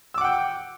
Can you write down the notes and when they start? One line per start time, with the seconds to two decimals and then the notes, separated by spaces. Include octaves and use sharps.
0.14 E6
0.18 D6
0.21 F#5
0.24 G5